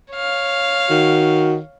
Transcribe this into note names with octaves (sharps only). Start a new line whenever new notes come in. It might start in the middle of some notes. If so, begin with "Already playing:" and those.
C#5 F5
D#3 F#4